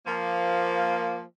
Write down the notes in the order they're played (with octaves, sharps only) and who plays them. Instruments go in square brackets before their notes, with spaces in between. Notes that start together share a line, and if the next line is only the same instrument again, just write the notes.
[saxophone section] F3 A#3